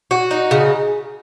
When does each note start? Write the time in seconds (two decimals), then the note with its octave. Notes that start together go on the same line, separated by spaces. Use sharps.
0.11 F#4
0.31 D#4
0.51 C#3